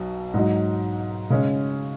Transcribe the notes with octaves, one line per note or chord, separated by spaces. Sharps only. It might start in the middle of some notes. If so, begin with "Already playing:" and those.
Already playing: B1 B2 F#3
G#2 F#3 D#4
C#3 G#3 C#4